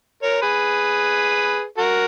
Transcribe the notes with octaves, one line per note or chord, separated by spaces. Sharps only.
A#4 C#5
G#4 B4
F#4 A#4